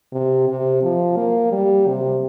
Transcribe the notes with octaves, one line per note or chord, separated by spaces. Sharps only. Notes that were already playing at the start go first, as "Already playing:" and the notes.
C3
C3
F3
A#3
G3
C3